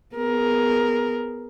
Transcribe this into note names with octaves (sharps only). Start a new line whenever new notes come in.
B3 G#4 A#4